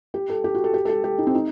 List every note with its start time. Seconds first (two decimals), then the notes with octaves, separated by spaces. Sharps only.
0.14 G4
0.29 A4
0.44 G4
0.55 F#4
0.64 A4
0.74 G4
0.85 A4
0.89 G4
1.04 G4
1.18 D#4
1.27 C4
1.35 D#4